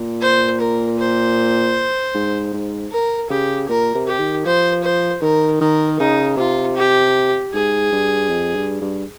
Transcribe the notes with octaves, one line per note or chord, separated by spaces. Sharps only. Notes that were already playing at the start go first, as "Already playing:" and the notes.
Already playing: A#2
C5
A#4
C5
G#2
G#2
A#4
C#3 G4
A#2 A#4
C3
G4
D#3
F3 C5
C5
D#3 A#4
D#3 A#4
C#3 D#4
C3 F4
G4
G#2 G#4
G2
F2
G2
G2